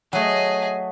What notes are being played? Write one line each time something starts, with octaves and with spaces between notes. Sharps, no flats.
F#3 A3 G#4 D#5